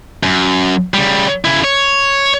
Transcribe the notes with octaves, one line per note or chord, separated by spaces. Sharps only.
F#2
C#3 G3
C#3 E4
C#5